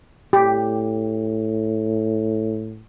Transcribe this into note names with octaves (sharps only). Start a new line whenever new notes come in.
A2 G4